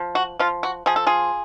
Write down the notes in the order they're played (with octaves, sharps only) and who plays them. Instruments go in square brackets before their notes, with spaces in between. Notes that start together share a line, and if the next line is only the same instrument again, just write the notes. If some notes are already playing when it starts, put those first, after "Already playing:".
Already playing: [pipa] F3
F#4
F3 F4
F#4
F3 G#4
A4
F4 G#4